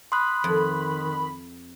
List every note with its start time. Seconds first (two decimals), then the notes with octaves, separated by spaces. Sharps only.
0.12 B5 C6 D#6 F#6
0.44 F2 D#3